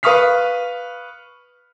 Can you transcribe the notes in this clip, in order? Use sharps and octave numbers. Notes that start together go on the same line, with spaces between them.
B4 F5 C#6 D#6 F6 B6